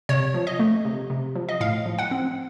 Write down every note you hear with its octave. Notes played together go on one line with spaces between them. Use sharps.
C3 C#5
F3
D#5
A3
C3
C3
F3
D#5
A2 F5
F3
F#5
C4